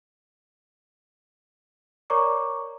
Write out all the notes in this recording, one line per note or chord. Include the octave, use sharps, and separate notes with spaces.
A#4 C#5 D5 A#5 C#6 D6